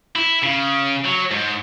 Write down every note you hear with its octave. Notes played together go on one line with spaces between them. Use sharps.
E4
C#3
F#3
G#2